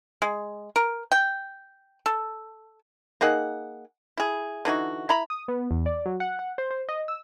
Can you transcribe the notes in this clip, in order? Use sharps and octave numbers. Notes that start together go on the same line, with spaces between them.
G#3
A#4
G5
A4
A#3 D#4 G#4 F#5
E4 G#4
D3 E3 D#4 F#4
E4 A#5 B5
D#6
B3
E2
D5
F#3
F#5
F#5
C5
C5
D#5
E6